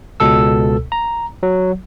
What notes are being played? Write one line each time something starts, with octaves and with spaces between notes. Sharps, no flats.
C#2 B2 A4 E6
A#5
F#3